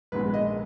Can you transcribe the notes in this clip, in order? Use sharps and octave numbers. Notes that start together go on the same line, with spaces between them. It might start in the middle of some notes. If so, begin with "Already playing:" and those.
A#1 G#2 D#3 G#3 B3 B4
D#5